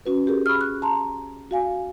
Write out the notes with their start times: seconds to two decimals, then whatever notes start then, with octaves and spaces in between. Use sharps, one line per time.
0.06 C#4 F#4 B4
0.27 G4 G#4 A#4
0.46 B5 C#6 E6 F6
0.61 F#6
0.82 A5 A#5 C6
1.51 F#4 F5 G#5